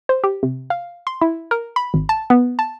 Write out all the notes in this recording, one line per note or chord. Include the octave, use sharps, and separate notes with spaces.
C5
G4
C3
F5
C6
E4
A#4
B5
G#1
A5
B3
A5